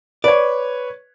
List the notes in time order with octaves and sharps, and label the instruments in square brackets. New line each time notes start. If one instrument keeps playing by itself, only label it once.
[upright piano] B4 C#5 [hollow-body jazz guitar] D5